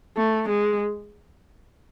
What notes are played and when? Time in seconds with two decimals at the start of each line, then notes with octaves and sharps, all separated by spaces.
0.17 A3
0.49 G#3